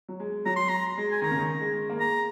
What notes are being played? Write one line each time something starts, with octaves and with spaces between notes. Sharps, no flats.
F#3
G#3
F#3 A#5
C6
A#5
G#3
G#5
D#3 A#5
C#3
D#3
G#3
A#3
G#3 A#5